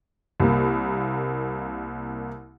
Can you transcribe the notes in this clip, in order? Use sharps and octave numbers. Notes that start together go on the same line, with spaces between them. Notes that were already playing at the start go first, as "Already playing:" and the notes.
C2 A#3